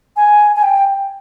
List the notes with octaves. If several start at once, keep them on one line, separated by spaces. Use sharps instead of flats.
G#5
G#5
G5